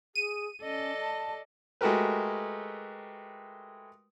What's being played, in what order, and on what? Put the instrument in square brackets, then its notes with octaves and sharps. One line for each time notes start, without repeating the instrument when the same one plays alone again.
[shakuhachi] G#4 [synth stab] D#7
[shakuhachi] C#4 [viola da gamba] A4 D5 D#5
[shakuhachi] A5
[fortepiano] G#3 A3 F#4 G4 A#4 B4